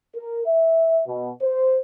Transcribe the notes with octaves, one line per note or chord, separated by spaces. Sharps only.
A#4
E5
B2
C5